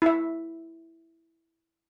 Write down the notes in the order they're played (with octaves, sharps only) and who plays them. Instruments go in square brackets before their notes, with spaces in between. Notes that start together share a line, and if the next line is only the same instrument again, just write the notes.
[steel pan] E4 E5